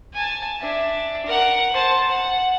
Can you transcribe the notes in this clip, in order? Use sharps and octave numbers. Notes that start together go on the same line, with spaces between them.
G#5 A5
D4 E5
A#4 F#5
C5 A5
F#5